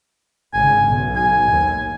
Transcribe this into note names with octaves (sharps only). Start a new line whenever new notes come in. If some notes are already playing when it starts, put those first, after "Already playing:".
G#1 C#3 G#5
B1
G#5
D#2